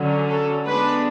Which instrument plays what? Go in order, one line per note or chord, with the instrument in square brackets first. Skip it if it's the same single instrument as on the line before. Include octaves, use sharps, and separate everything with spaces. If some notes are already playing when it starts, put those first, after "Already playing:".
Already playing: [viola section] D3 F#3 C#4
A4
G#3 B3 D4 B4